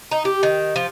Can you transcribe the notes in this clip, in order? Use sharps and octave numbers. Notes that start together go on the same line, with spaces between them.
D#4
G4
D#3
F3